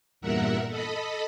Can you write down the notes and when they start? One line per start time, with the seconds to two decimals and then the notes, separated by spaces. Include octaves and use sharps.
0.21 E2 G2 A#2 A#4 E5 F#5
0.69 A4 D#5 B5